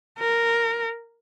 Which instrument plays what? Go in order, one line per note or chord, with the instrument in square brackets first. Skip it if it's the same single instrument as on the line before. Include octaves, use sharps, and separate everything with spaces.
[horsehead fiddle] A#4